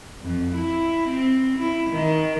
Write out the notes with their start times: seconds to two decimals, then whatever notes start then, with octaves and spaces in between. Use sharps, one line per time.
0.22 F2
0.55 E4
1.09 C4
1.58 E4
1.90 D#3